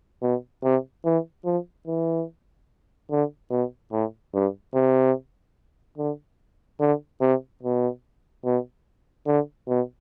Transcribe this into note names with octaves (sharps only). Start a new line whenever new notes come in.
B2
C3
E3
F3
E3
D3
B2
A2
G2
C3
D3
D3
C3
B2
B2
D3
B2